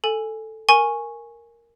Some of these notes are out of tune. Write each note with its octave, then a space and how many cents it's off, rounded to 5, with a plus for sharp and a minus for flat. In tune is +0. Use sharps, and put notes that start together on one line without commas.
A4 +0 G#5 +0
A#4 +0 G#5 +0 C#6 -10